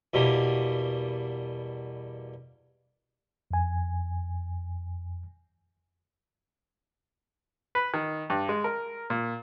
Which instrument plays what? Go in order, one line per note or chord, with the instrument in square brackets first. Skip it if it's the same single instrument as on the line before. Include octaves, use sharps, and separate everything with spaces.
[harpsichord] E2 B2 G3 A#3
[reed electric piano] F2 G#5
[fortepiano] B4
D#3
G2
G#3
A#4
A#2